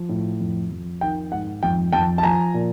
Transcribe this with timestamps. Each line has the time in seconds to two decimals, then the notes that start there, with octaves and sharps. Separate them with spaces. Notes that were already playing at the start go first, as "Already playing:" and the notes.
Already playing: F3
0.09 A2
0.40 F2
0.71 F2
1.01 D#3 G5
1.32 G#2 F#5
1.63 F2 G5
1.93 F2 G5 A5
2.18 A5
2.23 F3 G#5 A#5
2.54 A#2